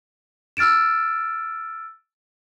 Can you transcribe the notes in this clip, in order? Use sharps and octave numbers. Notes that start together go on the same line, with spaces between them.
E6 F6 A6 D7 E7